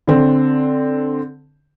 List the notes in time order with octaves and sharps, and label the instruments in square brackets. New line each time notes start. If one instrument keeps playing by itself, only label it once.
[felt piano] D3 C4